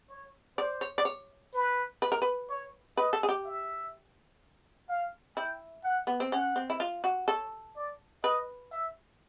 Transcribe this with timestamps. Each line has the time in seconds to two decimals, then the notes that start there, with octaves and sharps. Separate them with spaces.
0.10 C#5
0.58 C5 D5
0.81 C#5
0.98 D5
1.05 C#5
1.54 B4
2.02 B4
2.12 A#4
2.22 B4
2.50 C#5
2.97 B4 D#5
3.13 A4
3.23 G#4
3.29 G4
3.45 E5
4.89 F5
5.37 E4 G5
5.84 F#5
6.07 B3
6.20 C4
6.32 C#4 F#5
6.56 C4
6.70 E4
6.80 F4
7.04 F#4
7.28 A4 C#5
7.76 D5
8.23 B4 D#5
8.72 E5